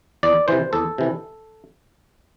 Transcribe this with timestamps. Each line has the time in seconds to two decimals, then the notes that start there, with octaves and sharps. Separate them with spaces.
0.23 E2 D5
0.48 C3 E3 C5
0.73 E2 A4
0.98 C3 E3